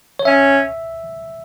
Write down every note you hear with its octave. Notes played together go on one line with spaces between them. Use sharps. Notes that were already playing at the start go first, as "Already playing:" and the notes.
C#5
C#4 E5